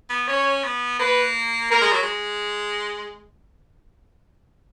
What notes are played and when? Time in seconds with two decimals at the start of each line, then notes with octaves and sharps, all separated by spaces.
0.10 B3
0.28 C#4 C#5
0.64 B3
0.99 A#3 B4
1.70 A#3 A#4
1.81 G#3
1.92 F#3
2.03 G#3